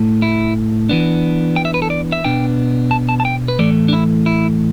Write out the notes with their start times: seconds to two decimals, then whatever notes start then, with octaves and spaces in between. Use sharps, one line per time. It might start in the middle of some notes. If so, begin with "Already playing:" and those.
Already playing: A2 A3
0.22 E4
0.89 E3 B3 D4
1.56 G5
1.65 E5
1.74 B4
1.82 A4
1.90 D5
2.12 E5
2.25 B2 B3 D4 G5
2.91 A5
3.09 A5
3.20 A5
3.25 G5
3.48 B4
3.59 A2 E3 A3 D5
3.88 D4
3.93 E4
4.26 E4